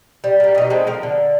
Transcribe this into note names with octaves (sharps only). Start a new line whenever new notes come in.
G3
G3 A#3
B2 D#4
G#3 A3 B3 C4
F3 A#4
D3